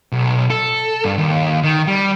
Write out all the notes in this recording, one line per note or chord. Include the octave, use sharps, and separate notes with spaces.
B1
A4
G2
D#2
D#3
G3